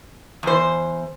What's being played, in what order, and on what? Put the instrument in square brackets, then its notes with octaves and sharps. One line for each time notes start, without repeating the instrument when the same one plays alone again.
[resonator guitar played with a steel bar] E2 C5